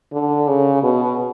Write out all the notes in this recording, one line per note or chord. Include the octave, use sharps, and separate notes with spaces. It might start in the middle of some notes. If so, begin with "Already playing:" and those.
D3
C#3
B2